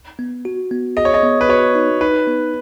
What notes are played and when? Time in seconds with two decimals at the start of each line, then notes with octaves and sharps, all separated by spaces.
0.19 B3
0.45 F#4
0.71 B3
0.97 G#4 D#5
1.05 C#5
1.14 D#5
1.23 B3
1.41 B4
1.49 F#4 C#5
1.75 D#4
2.01 D#4 B4
2.27 B3